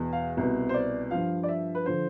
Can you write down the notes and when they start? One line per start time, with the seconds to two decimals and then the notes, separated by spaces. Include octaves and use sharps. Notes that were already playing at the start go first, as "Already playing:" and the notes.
Already playing: E2 B2
0.13 F5
0.37 C2 B2
0.69 C5
0.74 D5
1.11 G2 F3 F5
1.43 D5
1.48 E5
1.75 B4
1.86 D3 F3 C5